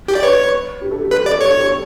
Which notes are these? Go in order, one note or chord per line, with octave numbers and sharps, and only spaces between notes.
G4
D5
B4 C#5
G4
A4
G4
A4 B4
G4
D5
A4
G4 C#5
A4
G4
A4